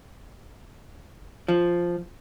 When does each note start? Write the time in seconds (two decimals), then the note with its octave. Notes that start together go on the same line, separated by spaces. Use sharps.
1.48 F3